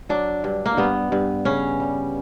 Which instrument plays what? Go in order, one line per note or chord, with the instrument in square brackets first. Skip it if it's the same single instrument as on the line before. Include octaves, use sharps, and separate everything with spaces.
[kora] F#3 D4
G2
A#3
G2 B3
G2
C#3 C#4
G3